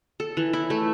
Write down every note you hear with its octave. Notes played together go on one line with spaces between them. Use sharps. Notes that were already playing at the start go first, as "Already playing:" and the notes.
A4
E3
E4
A3